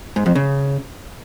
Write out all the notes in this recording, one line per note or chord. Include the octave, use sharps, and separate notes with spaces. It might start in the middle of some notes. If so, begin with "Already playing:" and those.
G#2
F2
C#3